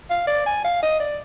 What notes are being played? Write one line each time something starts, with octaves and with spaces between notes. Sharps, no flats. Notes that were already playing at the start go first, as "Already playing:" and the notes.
F5
D5
G#5
F5
D#5
D5